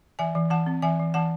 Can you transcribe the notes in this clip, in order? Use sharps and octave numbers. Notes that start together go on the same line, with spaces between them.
E3 E5 G#5
E3
E3 F#5 A5
C4
E3 E5 G#5
E3
E3 F#5 A5